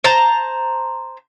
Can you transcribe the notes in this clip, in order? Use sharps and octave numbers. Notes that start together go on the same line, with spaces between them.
C5 A5 A#5